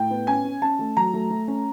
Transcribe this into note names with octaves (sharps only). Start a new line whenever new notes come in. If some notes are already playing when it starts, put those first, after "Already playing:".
Already playing: A2 G5
B3
C#4 G#5
C#4
C#4 A5
A3
F#3 A#5
A3
A3
C#4